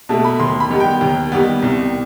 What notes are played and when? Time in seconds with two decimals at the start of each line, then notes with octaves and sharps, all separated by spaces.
0.09 B2 A3 A5
0.24 B5
0.40 D#2 C6
0.60 B5
0.71 D#3 G3 B3
0.80 G5
1.01 D#2
1.32 D#3 G3 B3
1.62 C2